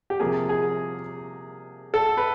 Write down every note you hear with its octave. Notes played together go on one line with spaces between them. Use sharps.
G4
C3 F3 A#3 G#4
G#4
A4
B4